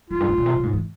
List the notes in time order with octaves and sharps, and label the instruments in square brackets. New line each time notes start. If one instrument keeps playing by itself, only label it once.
[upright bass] F2 [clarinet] F4
[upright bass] G2
G#2
A#2
C3
A#2
G#2
E3